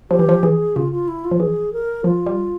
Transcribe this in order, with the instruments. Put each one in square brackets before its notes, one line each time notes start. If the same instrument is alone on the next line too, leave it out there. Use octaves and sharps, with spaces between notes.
[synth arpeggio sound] F3 [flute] G4
[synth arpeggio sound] E3
F3
[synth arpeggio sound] E3 [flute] G#4
[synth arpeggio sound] C#3 [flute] F4
[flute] F4
E4
F4
[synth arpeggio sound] F3
[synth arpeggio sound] E3 [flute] G#4
[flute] A#4
[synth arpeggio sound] F3 [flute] F4
[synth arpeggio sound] G3